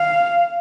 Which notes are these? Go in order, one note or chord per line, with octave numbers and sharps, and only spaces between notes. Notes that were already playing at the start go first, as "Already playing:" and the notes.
Already playing: F5